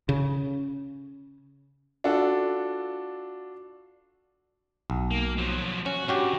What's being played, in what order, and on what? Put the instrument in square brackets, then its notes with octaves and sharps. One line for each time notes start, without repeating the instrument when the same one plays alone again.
[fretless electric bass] C#3
[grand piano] D4 F4 F#4 A4
[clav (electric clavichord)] B1
[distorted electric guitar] A#3
F3 F#3
[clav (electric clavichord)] C#4 [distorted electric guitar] F#4
[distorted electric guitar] G2 [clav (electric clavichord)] C#4 F#4 G4